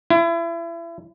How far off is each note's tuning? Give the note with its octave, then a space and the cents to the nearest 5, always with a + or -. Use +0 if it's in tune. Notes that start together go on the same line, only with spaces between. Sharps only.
E4 +30